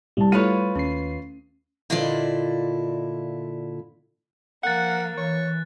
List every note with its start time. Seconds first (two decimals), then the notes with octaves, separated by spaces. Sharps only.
0.17 C2 G3 A5
0.32 A3 E4 F4 A4 B4 C#5 D#7
0.75 D#2 C#4 C7
1.90 A#2 D3 E4 F4 D5 D#5
4.63 F3 A#3 F#5 F#6 A6
5.18 E3 C#5